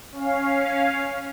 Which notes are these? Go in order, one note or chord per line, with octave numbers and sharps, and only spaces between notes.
C#4 F5